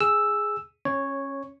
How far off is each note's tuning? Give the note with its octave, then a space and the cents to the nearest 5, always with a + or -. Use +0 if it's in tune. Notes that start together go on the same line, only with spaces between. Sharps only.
G#4 +0 E6 +0
C#4 -20 C#5 -5